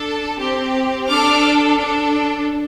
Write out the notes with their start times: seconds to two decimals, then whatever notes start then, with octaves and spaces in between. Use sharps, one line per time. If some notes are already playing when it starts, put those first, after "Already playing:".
Already playing: D4 A4
0.38 C4 G4
1.07 D4 A4 D6 F6
1.77 D4 A4